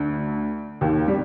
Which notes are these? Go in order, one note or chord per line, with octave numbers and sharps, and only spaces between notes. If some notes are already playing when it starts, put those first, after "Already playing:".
Already playing: D2 D3
D#2 D#3
G3